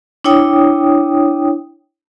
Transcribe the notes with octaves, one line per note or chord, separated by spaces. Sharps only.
D4 E4 C#5 G5 D#6